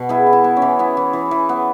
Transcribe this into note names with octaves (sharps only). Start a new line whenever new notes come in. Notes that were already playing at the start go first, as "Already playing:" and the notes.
Already playing: B2
B3 E4 G#4
E3
E4
B3
C#4
E3
B3 E4
E3
E3
E3
B3